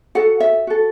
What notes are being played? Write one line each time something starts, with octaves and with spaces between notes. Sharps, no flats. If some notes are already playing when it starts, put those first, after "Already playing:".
F#4 A4 F#5
E5
F#4 A4